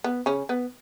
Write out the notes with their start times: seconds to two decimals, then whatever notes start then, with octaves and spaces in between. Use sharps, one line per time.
0.04 B3
0.26 C#3 C#4
0.49 B3